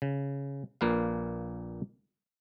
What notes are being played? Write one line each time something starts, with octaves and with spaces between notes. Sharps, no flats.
C#3
A#1 A#2 A#3 B4 F5